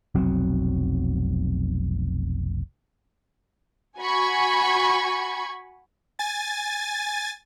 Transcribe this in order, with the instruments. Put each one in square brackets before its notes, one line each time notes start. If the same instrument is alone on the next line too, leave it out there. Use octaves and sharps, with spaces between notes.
[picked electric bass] F1 B1 F#3 C4
[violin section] F#4 G#5 B5 C#6 G#6
[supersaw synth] G#5 A6